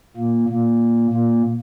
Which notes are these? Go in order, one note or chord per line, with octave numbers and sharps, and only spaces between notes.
A#2 A#3
A#2 A#3
A#2 A#3